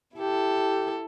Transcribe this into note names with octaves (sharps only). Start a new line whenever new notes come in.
E4 G4 A4